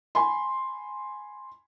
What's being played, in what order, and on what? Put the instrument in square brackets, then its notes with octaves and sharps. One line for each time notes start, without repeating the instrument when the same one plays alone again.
[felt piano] G#5 B5 C6